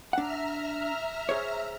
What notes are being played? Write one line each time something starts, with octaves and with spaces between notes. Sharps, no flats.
D4 E5 F#5 A#5 F6
G#4 C5 C#5